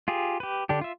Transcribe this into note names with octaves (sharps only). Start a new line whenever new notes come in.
F4 G4 G#4
G4 B4
D3 D4 G4
F4 E5